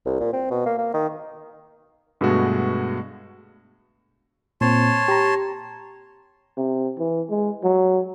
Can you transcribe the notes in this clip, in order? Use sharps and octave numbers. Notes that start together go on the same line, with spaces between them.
C2
A#2
C4
B2
A#3
A#3
D#3
G2 B2 G#3 A3 F#4
A#2 C4 C#5 A5 C6
G4 A#5
C3
E3
G#3
F#3